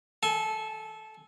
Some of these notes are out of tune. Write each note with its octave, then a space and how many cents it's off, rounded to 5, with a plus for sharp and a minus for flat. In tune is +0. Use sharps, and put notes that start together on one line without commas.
A4 -15 G#5 +10